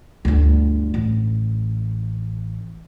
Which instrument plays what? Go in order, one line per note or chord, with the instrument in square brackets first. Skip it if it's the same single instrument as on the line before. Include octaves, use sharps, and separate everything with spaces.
[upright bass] G1 D2
A1